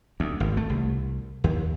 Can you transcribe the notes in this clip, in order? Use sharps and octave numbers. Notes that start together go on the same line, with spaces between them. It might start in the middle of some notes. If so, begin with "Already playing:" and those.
D2
G#1
A3
C2
D#2